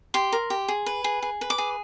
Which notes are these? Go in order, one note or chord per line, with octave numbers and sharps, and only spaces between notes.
G4 C6
A#4
G4
G#4
B4
G#4
G#4
B4
D6
G#4